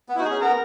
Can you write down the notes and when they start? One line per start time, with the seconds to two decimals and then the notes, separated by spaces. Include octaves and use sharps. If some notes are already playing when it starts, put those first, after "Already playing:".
0.09 B3
0.15 E4
0.19 D#4 F#4
0.25 C#4 G#4
0.41 B3 A#4